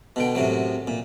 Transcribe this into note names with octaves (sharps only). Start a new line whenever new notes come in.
B2 D3 G5
F#2 A2 C3 F#3
A#2